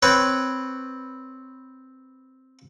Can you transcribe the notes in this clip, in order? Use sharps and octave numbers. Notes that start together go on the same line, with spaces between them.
C4 B4 C#5